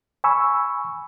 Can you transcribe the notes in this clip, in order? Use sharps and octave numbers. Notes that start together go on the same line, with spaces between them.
G#5 B5 C#6 E6